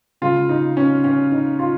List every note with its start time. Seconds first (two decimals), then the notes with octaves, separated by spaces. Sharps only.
0.21 C#3 G#3 F4
0.49 D#4
0.77 C#4
1.04 C#4
1.32 D#4
1.59 F4